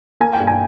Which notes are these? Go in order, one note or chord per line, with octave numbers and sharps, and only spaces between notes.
A#3 G#5
G5
G2
G#5